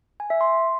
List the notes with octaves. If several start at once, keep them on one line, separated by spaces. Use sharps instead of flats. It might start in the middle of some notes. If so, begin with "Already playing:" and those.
G#5
E5
C6